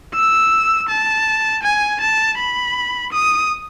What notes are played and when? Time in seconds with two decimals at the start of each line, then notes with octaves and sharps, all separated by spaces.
0.14 E6
0.89 A5
1.63 G#5
2.01 A5
2.38 B5
3.13 D#6